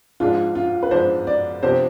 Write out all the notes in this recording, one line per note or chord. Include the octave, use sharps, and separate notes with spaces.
G#2 F3 G#3 D4 F4
F4
B4
G#2 F3 G#3 D4 C5
D5
C3 F3 B3 D4 G4 C5